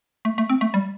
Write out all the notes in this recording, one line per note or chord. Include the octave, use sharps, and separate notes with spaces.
A3
A3
C4
A3
G3